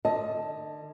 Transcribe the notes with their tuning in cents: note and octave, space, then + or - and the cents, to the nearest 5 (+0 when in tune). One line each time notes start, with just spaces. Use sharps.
D3 +45 D#5 +25 A5 +0